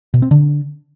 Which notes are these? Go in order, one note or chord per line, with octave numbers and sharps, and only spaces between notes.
B2
C4
D3